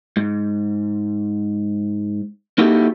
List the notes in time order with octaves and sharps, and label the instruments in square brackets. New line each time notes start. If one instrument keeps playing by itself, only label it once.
[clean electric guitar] G#2
A#3 D#4 E4 F#4 G4 A4